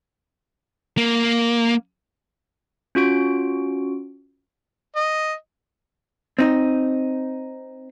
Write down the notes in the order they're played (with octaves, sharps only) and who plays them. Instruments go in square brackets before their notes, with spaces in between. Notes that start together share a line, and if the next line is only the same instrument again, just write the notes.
[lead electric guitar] A#3
[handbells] C#4 F4 F#4 D7
[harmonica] D#5
[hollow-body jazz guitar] C4 D#4